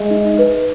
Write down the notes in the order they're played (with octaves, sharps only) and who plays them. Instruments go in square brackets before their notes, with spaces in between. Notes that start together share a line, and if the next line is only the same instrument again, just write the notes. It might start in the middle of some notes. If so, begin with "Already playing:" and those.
Already playing: [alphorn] G#3 [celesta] E5
[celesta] D#4
B4